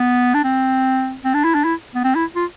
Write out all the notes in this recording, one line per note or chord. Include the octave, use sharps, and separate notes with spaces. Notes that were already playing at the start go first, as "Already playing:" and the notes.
Already playing: B3
D4
C4
C4
D4
E4
D4
E4
B3
C4
E4
F4